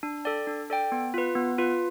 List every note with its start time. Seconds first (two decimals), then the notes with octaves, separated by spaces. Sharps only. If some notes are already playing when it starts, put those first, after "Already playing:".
0.03 D4
0.25 A4 D5 G5
0.47 D4
0.70 A4 D5 G5
0.92 B3
1.14 F4 B4
1.35 B3
1.58 F4 B4